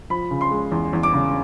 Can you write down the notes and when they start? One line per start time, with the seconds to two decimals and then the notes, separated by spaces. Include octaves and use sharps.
0.10 F3 B5
0.31 C#3
0.41 C6
0.51 G#3
0.72 E2
0.93 E2
1.03 D6
1.14 C#3